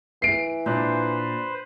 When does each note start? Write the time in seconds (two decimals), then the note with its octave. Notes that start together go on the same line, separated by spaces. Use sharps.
0.22 E3 C7 D7
0.66 A#2 D4 B4 C5 F#6